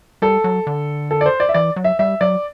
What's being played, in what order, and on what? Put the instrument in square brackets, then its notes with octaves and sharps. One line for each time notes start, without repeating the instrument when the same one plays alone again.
[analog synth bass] G3 [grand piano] A4
[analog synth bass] F#3
D3
[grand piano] A4
D5
C5
D5
E5
[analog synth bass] E3 [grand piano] D5
[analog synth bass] F#3
[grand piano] E5
[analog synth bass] G3 [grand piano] E5
[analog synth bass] F#3 [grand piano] D5